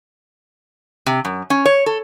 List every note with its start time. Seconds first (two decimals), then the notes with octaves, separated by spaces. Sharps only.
1.06 C3
1.25 F#2
1.50 C#4
1.65 C#5
1.86 A4